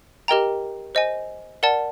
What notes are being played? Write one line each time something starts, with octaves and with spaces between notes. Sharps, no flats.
G4 A#4 D#5 G5 A#5
C5 D#5 G#5
A#4 D5 F#5 A5